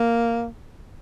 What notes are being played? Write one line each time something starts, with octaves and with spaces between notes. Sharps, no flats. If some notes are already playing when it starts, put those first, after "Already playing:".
Already playing: A#3